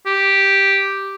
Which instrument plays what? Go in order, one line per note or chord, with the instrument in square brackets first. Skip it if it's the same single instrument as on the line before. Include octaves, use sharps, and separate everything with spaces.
[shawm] G4